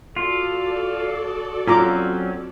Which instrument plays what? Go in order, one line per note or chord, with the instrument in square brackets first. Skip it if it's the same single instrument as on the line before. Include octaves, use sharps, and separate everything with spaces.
[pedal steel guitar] F4 [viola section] F#4 A4 D5
[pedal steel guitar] F#3 C4 C#4 [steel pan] F4 A#5 D6